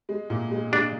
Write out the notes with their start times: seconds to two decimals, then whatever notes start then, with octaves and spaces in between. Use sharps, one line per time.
0.09 G#3
0.30 A#2
0.51 G#3
0.72 G#3 D4